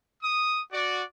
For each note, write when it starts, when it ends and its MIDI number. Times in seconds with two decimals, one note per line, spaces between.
0.23 0.62 87
0.73 1.03 66
0.73 1.03 74